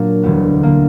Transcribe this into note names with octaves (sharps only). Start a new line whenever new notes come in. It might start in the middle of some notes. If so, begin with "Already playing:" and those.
Already playing: A#2 F#3 A#3 D4
E1 D2 D3 G3 B3
D3 A#3 D4